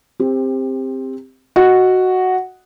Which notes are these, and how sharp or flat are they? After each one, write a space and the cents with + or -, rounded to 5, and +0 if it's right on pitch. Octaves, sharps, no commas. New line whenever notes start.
C4 +5 G4 +25
F#4 +0 D#5 +0